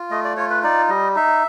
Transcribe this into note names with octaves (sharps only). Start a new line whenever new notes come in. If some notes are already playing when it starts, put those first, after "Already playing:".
Already playing: F4
A3 D#5
D5
F4 C#5
B4
D#4 D5
G3 D#5
D#4 E5